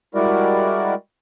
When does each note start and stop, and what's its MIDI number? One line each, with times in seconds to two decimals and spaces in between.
0.15 0.94 55
0.15 0.94 56
0.15 0.94 64
0.15 0.94 66
0.15 0.94 70
0.15 0.94 74